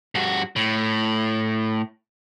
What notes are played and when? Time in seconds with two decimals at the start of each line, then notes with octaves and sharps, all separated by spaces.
0.15 G2 F#4
0.56 A2